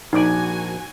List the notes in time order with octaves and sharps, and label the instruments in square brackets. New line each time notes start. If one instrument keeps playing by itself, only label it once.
[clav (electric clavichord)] A#1 D5 [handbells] D#4 [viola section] F#4 G#5